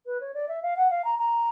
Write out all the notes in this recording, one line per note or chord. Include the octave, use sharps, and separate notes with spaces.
B4
C#5
D5
E5
F5
F#5
F5
A#5
A#5